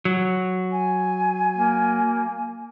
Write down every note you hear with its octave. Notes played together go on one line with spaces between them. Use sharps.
F#3
G#5
A#3